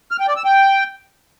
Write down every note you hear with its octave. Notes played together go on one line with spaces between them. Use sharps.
F6
G5
D5
E6
G5